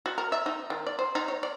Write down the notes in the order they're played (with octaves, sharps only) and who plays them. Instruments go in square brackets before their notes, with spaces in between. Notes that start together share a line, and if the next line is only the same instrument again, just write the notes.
[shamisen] F#4
A#4
E5
D#4
D#3
D5
C5
D#4
C#5
D5